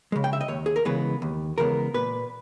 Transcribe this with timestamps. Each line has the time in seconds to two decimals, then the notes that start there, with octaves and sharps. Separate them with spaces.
0.12 C#3 G#3
0.24 G5
0.33 E5
0.41 D#5
0.48 D#2 C#5
0.66 G#4
0.76 A#4
0.85 C#3 E3 G#3 B3 B4
1.22 D#2
1.58 C#3 E3 G#3 B3 A#4
1.94 A#2 B4